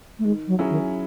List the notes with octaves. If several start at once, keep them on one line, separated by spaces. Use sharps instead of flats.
A3
D#3 G#3
F#3
F#3 C#4 E4 G#4
D#3